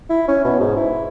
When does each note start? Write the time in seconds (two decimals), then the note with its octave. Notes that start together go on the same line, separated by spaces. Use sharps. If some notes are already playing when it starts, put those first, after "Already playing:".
0.10 E4
0.28 C#4
0.44 B2
0.60 G#2
0.77 E4